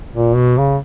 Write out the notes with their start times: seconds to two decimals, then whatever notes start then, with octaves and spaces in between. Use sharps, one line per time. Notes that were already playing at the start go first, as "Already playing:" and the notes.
0.13 A#2
0.35 B2
0.58 C#3